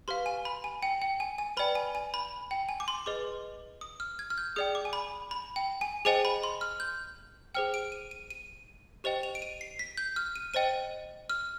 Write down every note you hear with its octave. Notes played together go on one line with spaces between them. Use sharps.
G4 B4 F5 C6
G#5
B5
G#5
G5
G5
G#5
G#5
B4 D5 G5 B5
G#5
G#5
B5
G5
G#5
D6
C6
G#4 B4 D#5 D6
D#6
F6
G#6
F6
G6
G#4 D5 G5 D#6
D6
G#5
B5
B5
G5
G#5
G#4 C5 D#5 G5 G#5
B5
C6
F6
G6
G#4 C5 G5 F6
D7
D#7
D#7
D#7
G4 C5 D#5 G5 F7
F7
D7
D#7
C7
B6
G6
F6
D#7
C5 D#5 G5 D#7
F6